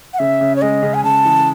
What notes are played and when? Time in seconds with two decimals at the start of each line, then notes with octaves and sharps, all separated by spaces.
0.13 F#5
0.19 C#3 E5
0.41 C#3
0.56 C#5
0.62 G#3 D#5
0.83 C#3
0.94 G#5
1.04 C#3 A5
1.25 E3